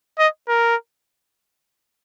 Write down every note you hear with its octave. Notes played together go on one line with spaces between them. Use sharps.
D#5
A#4